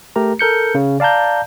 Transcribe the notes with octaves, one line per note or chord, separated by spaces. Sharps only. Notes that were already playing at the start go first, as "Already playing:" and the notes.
A3 G4 A#4 A#5
A4 A#4 G6 C#7
C#3
D5 F5 A5 A#5 G6